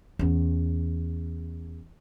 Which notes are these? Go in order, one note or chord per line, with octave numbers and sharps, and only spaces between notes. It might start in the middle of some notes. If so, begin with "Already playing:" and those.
E2 C#4